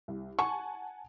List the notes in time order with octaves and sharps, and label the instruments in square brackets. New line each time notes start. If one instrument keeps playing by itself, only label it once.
[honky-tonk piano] C2
[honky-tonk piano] F#5 G#5 A5 [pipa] C#6